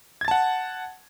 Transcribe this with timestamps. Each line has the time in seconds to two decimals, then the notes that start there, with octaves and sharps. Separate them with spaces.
0.21 G#6
0.25 A6
0.28 A5
0.31 F#5